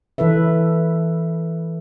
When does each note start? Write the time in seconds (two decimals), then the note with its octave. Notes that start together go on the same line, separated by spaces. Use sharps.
0.18 E3 E4 A4 B4 E5